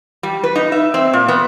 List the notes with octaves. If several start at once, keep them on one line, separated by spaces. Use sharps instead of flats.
G3
B4
D#4
E5
C4
A#2
B3